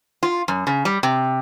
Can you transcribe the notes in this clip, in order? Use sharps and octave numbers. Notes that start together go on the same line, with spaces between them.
F4
F#2
C#3
G3
C3